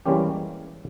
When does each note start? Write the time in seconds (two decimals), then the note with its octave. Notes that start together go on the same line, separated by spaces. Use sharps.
0.06 E3 G3 G#3 A#3 C#4 G4